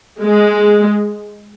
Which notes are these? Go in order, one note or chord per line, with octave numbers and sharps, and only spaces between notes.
G#3